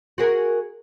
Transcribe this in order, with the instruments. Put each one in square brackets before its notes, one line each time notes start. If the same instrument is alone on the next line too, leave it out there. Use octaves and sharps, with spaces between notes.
[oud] F#4 G#4 A#4